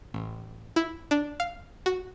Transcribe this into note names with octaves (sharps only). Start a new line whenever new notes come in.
A1
E4
D4
F5
F#4